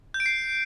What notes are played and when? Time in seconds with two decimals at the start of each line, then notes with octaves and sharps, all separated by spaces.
0.14 G6
0.20 D7
0.26 C7